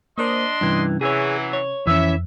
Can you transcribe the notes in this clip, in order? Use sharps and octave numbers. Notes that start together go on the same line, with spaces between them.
A#3 D4 A#4 C5 D#5 C6
G2 C3 E3 C#4
E3 F#3 G#4 C#5
C#5
F2 E3 C#4 E5